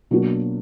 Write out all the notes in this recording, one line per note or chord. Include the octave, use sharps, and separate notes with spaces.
B2 F#3 A#3 D4 F#4